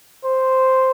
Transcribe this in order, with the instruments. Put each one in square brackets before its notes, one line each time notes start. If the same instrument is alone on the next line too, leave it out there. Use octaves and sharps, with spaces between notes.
[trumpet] C5